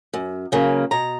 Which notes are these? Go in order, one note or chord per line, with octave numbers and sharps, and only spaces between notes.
F#2
C#3 F#3 A#3
B2 A#5